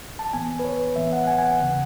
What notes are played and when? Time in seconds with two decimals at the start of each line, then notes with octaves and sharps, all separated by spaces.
0.19 A5
0.33 A2 E3 B3 G#5
0.59 B4
0.65 C#5
0.96 A2 E3 B3 E5
1.13 F#5
1.24 F#5
1.27 G#5
1.39 G#5
1.44 F#5
1.59 D#2 C#3 E3